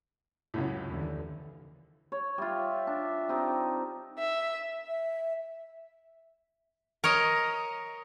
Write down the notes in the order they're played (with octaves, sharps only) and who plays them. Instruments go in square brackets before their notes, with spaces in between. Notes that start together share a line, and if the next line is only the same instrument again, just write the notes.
[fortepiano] C#2 F#2 A2
[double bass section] D#2 D3 E3
[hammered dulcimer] C#5
[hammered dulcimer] G3 F4 [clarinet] E5
[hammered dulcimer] D4
C4 D#4 G4
[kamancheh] E5
[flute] E5
[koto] A#4 C#5 D#5